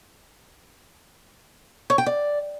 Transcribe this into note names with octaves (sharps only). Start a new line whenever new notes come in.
C#5
G5
D5